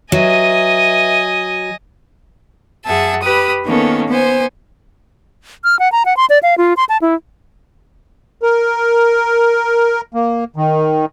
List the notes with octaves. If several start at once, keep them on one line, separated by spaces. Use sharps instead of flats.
F#3 B4 D#5 E5 G#5
F#2 G#4 E5 F#5 A5
G4 B4 B5 D#6
D#3 A#3 B3 C#4 A4
B3 C5 G#5
F6
F#5
A#5
F#5
C6
D5
F5
F4
C6
A5
E4
A#4
A#3
D#3